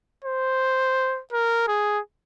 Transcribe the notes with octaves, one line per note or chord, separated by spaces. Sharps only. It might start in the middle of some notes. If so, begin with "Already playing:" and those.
C5
A#4
G#4